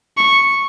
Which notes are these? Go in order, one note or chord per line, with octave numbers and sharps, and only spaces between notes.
C#6